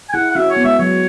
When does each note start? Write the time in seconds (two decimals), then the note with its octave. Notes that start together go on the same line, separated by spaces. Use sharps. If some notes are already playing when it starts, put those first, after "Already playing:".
0.09 G#5
0.14 E4 G#4 F#5
0.31 F#5
0.35 C#4 F#4 E5
0.50 C#5
0.56 B3
0.64 G#3 E5
0.79 F#3 C#5